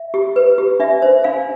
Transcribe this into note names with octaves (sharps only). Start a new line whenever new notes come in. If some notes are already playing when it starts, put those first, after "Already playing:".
Already playing: E5
G4
B4
G4
D4 E5
C5
D4 F5